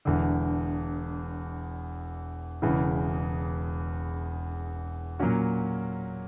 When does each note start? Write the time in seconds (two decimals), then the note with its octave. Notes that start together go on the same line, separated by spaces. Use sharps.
0.05 E1 E2 D3
2.62 E1 E2 C#3 E3
5.19 A#2 F#3 A#3 C#4 F#4